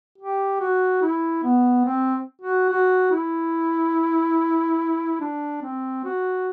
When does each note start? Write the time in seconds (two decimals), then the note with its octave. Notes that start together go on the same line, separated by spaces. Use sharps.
0.18 G4
0.60 F#4
1.02 E4
1.43 B3
1.85 C4
2.42 F#4
2.70 F#4
3.11 E4
5.20 D4
5.62 C4
6.04 F#4